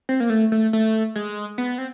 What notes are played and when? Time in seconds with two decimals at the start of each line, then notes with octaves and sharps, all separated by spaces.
0.09 C4
0.20 A#3
0.30 A3
0.52 A3
0.73 A3
1.16 G#3
1.58 B3
1.78 C4